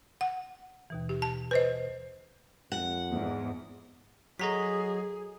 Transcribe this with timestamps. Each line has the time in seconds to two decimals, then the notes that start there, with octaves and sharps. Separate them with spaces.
0.21 F#5
0.90 D#2 B2 E3
1.09 G4
1.22 A5
1.51 B4 C5 D#5
2.72 F2 F#5
3.10 E2 G#2
4.39 F#3 F#4 G#4 A4 D#5 A#5 B6